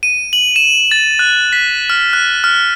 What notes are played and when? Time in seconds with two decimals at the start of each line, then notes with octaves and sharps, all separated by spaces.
0.03 D#7
0.33 F#7
0.56 E7
0.91 A6
1.19 F#6
1.53 B6
1.90 F6
2.13 F#6
2.44 F6